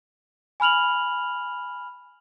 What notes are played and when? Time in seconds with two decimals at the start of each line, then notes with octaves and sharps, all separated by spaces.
0.60 G#5 B5 F6 F7 F#7